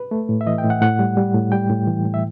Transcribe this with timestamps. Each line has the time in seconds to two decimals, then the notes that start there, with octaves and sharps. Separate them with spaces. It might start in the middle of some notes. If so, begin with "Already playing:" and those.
Already playing: B4
0.11 A3
0.29 A2
0.41 E5
0.47 E3 D#5
0.58 G5
0.64 A2
0.70 F#5
0.81 A2 F#5
0.99 G3
1.17 G3
1.34 A2
1.52 G3 G5
1.70 A2
1.87 E3
2.06 A2
2.14 E5